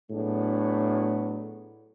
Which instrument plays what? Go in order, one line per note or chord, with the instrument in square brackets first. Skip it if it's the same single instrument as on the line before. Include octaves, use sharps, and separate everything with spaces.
[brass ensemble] A2 F#3 B3 D4 G#4